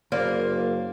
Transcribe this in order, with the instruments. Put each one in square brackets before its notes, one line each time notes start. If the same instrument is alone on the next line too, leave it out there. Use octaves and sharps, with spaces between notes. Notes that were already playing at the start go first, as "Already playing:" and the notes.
[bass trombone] F#1 [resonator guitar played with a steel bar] A#3 [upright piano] C5 D5 F5